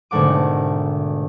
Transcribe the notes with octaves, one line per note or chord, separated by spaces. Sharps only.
G#1 B2 D3 A3 F#5 D6